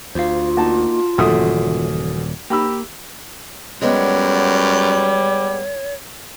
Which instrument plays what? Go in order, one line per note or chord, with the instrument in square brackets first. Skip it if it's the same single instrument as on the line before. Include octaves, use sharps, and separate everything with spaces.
[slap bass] D2 [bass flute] F4 [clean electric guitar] C5 F5
[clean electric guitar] A#3 D#4 [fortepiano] F#4 A5
[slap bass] D#1 A#2 [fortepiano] F#2 A3 D#6 [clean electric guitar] C#3 E3
[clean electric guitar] A#3 [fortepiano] G4 B5 E6
[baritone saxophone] F#2 [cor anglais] G3 [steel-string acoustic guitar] G#3 B3 [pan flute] C#5